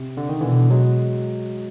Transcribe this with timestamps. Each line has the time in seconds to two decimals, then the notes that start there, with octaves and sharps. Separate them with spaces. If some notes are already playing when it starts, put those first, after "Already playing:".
Already playing: C3
0.17 D3
0.29 D#3
0.41 B2 D3 E3
0.70 F#3 G#3